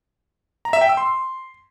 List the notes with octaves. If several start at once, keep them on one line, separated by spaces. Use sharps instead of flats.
A#5
E5
G5
E6
C6